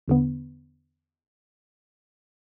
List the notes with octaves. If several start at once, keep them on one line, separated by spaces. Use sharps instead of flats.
E2 D3 B3